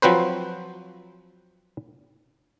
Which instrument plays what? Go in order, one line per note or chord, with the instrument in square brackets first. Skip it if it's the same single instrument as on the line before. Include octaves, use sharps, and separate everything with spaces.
[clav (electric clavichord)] F3 F#3 C4 B4 C5